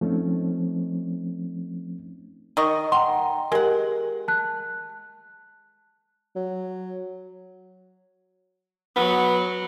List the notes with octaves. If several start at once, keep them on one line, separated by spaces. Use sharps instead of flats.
F3 A3 C4 C#4 D#4
D#3 D#5 C#6
F#5 G5 A#5 C6
G#3 G4 A#4 F#5
A5 F#6
F#3
F#3 B3